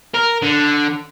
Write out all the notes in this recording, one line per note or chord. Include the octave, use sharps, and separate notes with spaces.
A#4
D3